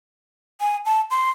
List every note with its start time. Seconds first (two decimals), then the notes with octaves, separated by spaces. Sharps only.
0.60 G#5
0.85 A5
1.11 C6